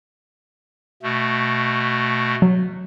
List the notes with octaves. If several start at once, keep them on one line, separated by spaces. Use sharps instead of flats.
B2 A3
F#3